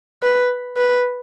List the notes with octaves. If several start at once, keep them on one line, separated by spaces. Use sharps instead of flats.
B4
B4